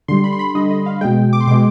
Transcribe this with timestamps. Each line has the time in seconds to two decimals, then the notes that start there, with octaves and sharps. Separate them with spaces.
0.08 D3 G3 C6
0.24 B5
0.33 C6
0.39 B5
0.55 D3 G3 D#5
0.71 D#5
0.86 F5
1.01 B2 G#3 G5
1.33 D6
1.41 C6
1.47 B2 G#3 D6